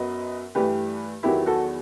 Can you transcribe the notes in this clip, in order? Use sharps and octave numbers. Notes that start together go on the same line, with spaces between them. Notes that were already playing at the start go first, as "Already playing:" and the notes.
Already playing: F#2 F#3 B3 B4 D#5
G2 E3 A3 G4 B4
E2 D#3 F#3 B3 E4 G4
F#4 A4